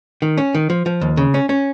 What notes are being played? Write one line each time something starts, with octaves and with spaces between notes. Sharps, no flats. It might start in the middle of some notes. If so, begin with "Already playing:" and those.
D#3
C#4
D#3
F3
F3
D#2
C#3
C#4
C#4